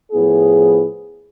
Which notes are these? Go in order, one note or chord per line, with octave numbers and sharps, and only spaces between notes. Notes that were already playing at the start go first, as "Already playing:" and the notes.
A2 F3 B3 E4 G#4